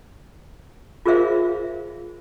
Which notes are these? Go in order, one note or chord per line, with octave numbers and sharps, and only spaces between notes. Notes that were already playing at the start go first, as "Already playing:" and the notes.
F4 G#4 A#4 C5 E5 F5